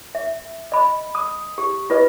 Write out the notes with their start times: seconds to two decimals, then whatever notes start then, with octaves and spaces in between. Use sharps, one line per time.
0.15 E5
0.72 D#5 B5
1.15 D#6
1.58 G4
1.90 F4 B4 D#5